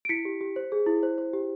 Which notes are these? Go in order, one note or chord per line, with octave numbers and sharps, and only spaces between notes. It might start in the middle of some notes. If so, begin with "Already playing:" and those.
D7
E4 B6 C#7
G4
G4
C5
G#4
E4
C5
C5
G4